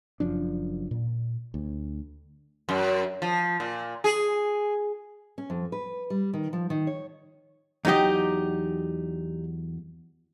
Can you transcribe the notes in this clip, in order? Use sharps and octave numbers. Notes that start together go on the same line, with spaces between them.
F#1 F#2 F3 D4
A#2
D2
F#2
F3
A#2
G#4
C#4
F2
B4
G3
D#3
F3
D#3
C#5
E2 F#3 D#4 G4 D#5